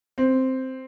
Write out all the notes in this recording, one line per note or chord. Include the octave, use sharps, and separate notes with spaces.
C4